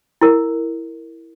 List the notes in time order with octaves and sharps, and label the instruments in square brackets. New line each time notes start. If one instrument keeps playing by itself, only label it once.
[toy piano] E4 A#4